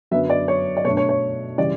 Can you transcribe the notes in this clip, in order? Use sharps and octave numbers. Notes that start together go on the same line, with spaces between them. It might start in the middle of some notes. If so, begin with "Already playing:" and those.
F#2 D3 F#3 B3 E5
D5
C#5
D5
B2 A3 D4 C#5
C#5
C#5
C#3 E3 G3 D5